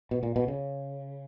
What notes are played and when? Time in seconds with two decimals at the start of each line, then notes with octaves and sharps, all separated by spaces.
0.11 B2
0.23 A#2
0.36 B2
0.48 C#3